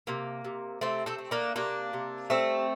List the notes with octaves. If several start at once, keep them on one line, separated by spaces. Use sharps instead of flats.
C3 A#3
C3
C3 A3 C4
A3 C4
A3
A#3 D4
C3 A#3 D4
C3
G3 A3 C4